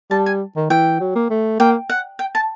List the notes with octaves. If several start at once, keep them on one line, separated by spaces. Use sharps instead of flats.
G3 A5
G#5
D#3
E3 G5
F#3
A#3
A3
A#3 G5
F#5
G5
A5